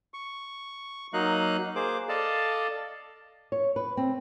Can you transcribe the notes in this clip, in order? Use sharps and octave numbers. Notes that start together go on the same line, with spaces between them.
C#6
F#3 A#3 D#4 D#5 F5 F#6
A#3 G#4 C5 D6
A4 D5 D#5 F5 A5
C#5
B4
C4